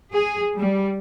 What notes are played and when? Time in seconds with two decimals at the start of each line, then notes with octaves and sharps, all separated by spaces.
0.14 G#4
0.56 G3